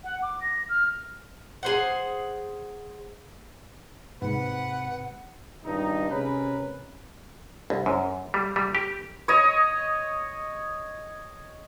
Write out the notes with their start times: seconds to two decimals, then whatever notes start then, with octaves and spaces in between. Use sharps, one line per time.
0.04 F#5
0.22 D6
0.41 A#6
0.69 F6
1.63 G#4 C5 F#5
4.22 G#2 C3 B4 F#5
5.64 G#1 C#2 G2 D#4
6.09 C3 G#3 C#4 G#4 A#4 B4
7.70 C2
7.86 F#2
8.34 G3
8.56 G3
8.75 G4
9.28 C#5 D#5